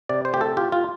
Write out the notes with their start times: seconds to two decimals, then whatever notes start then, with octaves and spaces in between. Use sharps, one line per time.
0.09 C3 D5
0.25 C5
0.33 A3 G4
0.41 A4
0.57 F4 G4
0.72 F4